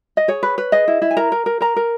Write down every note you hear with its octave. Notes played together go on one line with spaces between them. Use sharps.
D#5
G#4 C#5
B4
B4
G#4 D#5
E4
E4
G#5
A#4 A#5
A#4
A#4
A#4 A#5
A#4